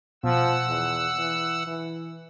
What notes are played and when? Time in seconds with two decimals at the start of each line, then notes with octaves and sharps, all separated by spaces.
0.24 B2 F3 F#5 E6
0.68 E2
1.19 E3
1.67 E3